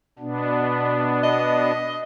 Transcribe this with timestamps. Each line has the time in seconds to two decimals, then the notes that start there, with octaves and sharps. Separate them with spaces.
0.19 B2 B3 D4
1.24 D#5